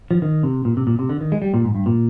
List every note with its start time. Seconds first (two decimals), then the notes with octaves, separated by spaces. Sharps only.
0.11 F3
0.22 D#3
0.43 C3
0.65 A#2
0.77 C3
0.87 A#2
0.99 C3
1.09 D3
1.21 D#3
1.32 G#3
1.42 G3
1.54 A#2
1.64 G#2
1.75 G2
1.86 A#2